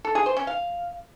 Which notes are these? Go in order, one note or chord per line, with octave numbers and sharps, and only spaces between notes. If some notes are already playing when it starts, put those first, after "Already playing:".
A4
G#4
C5
C#4
F5